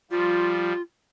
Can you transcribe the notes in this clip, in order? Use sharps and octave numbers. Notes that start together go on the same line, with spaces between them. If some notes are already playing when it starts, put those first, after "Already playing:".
F3 G3 F4